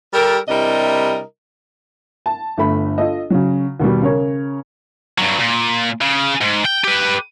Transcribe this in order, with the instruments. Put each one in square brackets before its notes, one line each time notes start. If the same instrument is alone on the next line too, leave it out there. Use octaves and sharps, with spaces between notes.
[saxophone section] G3 G4 A4 A#4
C3 G3 D4 E4 A#4 D#5
[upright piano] A5
G1 A3 B5
F4 A4 D#5
C#3 F#3
D#2 B2 D#3 G3
C#3 A#4 C#5
[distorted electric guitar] G2 F#3
A#2
C#3
G#2
G5
G4 B4